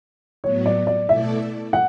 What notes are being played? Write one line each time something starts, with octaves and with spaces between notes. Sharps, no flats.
A2 F#3 B3 C#5
D5
D5
B2 A3 E4 A4 D5 E5
F#5